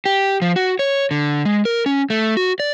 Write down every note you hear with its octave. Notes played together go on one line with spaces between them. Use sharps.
G4
F3
F#4
C#5
D3
G#3
A#4
C#4
A3
F#4
D5